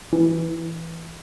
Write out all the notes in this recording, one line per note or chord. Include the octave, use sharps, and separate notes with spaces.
E3